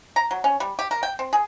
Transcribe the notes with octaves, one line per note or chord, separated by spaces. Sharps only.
A#5
F#3
C#4
G3
G4
A#4
G5
C4
G#4